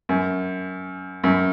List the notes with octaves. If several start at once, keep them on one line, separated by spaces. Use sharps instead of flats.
F#2
F#2